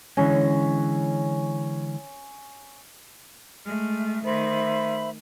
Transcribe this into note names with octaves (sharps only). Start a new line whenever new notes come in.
D3 E3 G#3 C#4
G#3 A3 F6
D#3 A3 C5 E5 B5